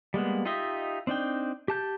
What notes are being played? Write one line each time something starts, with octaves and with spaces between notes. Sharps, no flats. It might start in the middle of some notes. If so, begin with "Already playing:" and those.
G3 G#3 A#3 B3
D#4 F4 G4 D#5 E5
C4 D4 D#4 G5
G4 A5 G6